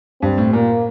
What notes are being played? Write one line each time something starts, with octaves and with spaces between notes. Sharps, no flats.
G2 C4
A2
A#2 A#3